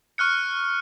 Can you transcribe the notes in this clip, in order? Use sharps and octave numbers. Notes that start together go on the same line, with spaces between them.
C#6 F6 F#6 C#7